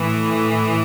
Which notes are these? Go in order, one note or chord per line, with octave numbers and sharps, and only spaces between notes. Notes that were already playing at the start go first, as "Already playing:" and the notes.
Already playing: A2 E3